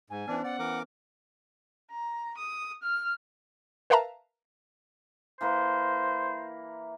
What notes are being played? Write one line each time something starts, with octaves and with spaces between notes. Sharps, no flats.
G#2 G#5
E3 B3 C#4 D4 C5
D5 F#5
E3 A#4 D6
A#5
D#6
F6
A#4 B4 E5 F5 A5 A#5
E3 A#3 B4 C5